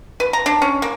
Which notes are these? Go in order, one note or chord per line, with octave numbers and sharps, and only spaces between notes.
B4
A#5
D4
C#4
A#3